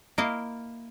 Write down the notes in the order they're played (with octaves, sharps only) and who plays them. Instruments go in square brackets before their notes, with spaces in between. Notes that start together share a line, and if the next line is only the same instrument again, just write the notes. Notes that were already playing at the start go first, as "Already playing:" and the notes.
[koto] A#3 E4 D#5 F5